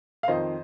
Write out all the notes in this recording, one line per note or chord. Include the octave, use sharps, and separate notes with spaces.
F5
F2 D#3 C5 D#5